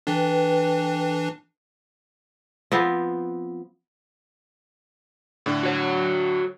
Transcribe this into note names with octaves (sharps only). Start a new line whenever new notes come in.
E3 D4 A4 B4 G5
F3 B3 C4
A2 D3 D4
F#4 C#5